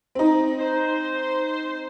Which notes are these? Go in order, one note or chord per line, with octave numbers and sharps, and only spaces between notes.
C4 D#4
C5